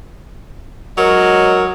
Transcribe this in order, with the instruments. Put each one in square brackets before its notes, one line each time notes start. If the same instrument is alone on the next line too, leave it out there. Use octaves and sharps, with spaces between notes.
[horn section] G#2 C#5 D#5 [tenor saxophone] F#3 [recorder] A#4